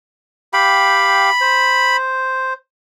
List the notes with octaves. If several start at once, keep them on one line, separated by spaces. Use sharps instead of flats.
G4 F5 G5 B5
C5